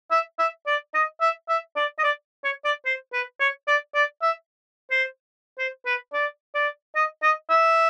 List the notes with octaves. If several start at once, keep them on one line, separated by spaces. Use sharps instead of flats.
E5
E5
D5
D#5
E5
E5
D5
D#5
D5
C#5
D5
C5
B4
C#5
D5
D5
E5
C5
C5
B4
D5
D5
D#5
D#5
E5